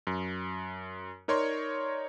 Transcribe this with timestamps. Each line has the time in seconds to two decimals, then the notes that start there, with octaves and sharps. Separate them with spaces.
0.07 F#2
1.28 D#4 A#4 C#5 D5 C6 C#6